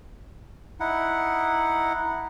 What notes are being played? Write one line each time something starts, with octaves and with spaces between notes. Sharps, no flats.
D#4 E4 F#5